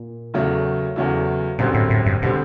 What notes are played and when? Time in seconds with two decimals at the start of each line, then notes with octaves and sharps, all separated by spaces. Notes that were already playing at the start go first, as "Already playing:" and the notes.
Already playing: A#2
0.34 E2 C#3 F#3 A3
0.96 E2 C#3 F#3 A3
1.59 F#2 A#2 D3 G3 C4
1.74 A2
1.90 A2
2.06 G2
2.22 B2 D3 G3 C4